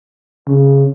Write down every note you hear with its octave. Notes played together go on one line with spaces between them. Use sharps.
C#3